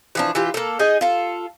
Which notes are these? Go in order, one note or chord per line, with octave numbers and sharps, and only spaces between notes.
E3 F3 D4
E3 F4 G4
A#3 A4
D#4 G#4 D#5
F4 A4